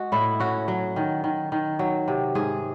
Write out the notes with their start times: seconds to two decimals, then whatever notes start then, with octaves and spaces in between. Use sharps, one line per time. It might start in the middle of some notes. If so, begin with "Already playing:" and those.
Already playing: G#3 F#4
0.12 A2 E4
0.40 C#4 F#4
0.68 F#3
0.96 D#3
1.24 D#3
1.52 D#3
1.79 F#3
2.08 C3
2.35 G#2 G#4